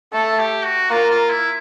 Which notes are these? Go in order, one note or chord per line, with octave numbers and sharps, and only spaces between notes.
A3 A4
G4
F#4
A#3 F4
F4
E4